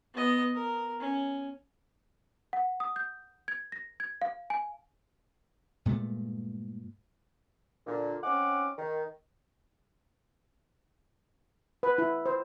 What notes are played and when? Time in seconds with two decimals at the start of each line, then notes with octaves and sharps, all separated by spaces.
0.14 B3 D#5
0.54 A#4
1.00 C#4
2.53 F#5
2.80 D#6
2.96 G6
3.48 G#6
3.72 A#6
4.00 G#6
4.22 F5
4.50 G#5
5.86 G2 A#2 G#3 A3
7.87 A#2 D3
8.24 C4 C#4 D#4 F#5 G#5 D6
8.78 D#3
11.83 B4
11.98 E4
12.26 C5